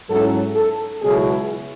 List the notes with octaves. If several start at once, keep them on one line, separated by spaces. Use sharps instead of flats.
G#2 F#3 C#4 E4 A4
A4
C#2 B2 F#3 C#4 E4 G#4